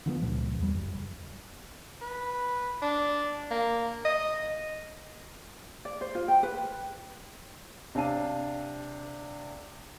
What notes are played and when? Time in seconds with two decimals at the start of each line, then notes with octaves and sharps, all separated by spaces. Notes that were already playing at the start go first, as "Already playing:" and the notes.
0.06 D3 F3 A3 B3
0.22 C#2 A#2 F3
0.58 E2 G3
0.74 F#1
2.01 B4
2.82 D4
3.51 A#3
4.05 D#5
5.85 D5
6.01 C5
6.15 F4
6.28 G5
6.43 B4
7.95 C3 D4 F5 A5 D#7